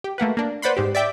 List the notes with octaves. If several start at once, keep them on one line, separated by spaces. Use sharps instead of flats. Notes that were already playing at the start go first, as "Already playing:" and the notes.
G4
A3 A#3 F#4 B4
A#3 D4
B4 C5 D5 F#5 B5 C6
G#2 C4 G4
D5 E5 G5 D6